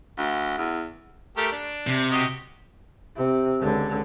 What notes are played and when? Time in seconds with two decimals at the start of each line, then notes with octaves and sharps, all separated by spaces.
0.18 D2
0.57 E2
1.37 A3 G4 A#4
1.52 D4
1.87 C3
2.11 F#4 G4 D#5
3.16 C3
3.60 C#2 D3